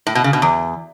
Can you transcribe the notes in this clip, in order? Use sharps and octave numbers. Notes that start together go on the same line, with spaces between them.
A2
B2
C#3
B2
E2